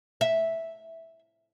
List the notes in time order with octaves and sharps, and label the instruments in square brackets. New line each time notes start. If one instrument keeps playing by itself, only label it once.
[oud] E5